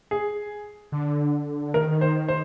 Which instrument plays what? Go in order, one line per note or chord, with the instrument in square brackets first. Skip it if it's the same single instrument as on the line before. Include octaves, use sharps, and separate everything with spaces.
[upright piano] G#4
[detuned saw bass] D3
[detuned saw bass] D#3 [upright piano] A#4
[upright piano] C5
C5